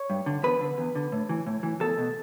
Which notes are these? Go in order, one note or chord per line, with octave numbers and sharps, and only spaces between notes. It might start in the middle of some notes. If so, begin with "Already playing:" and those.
Already playing: C#5
G2
D3
E2 B4
D3
E2
D3
A2
E3
A2
E3
E2 A4
B2